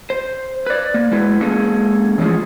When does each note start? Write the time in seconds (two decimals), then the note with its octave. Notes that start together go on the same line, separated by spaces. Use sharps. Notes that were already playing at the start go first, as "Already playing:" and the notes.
0.10 C5
0.67 B4 D5
0.94 A#3
1.12 G#3 E4 B4
1.41 G#3 A#3 C#4 G#4 A4
2.18 E3 F3 A3 C#4 F4 G#4